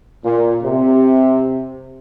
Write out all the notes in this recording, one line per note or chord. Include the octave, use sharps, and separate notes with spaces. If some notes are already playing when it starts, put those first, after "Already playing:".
A#2
C3